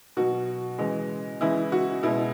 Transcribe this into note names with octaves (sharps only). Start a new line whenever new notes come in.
B2 F#3 F#4
C#3 E3 G#3
C#3 E3 G#3 E4
F#4
B2 G#3 E4